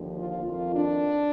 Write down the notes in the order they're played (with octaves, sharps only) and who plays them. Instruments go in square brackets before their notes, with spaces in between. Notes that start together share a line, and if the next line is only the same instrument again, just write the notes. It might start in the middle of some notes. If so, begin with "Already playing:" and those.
Already playing: [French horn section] D#2 D3 F3
F4
F2 D#3 F4
D4